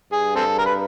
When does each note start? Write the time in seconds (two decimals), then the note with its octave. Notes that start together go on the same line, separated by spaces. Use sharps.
0.13 G2 G#4
0.36 C4 A4
0.58 A#4
0.66 B4